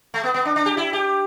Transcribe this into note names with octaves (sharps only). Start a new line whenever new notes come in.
A3
B3
B3
D4
D4
G4
E4
G4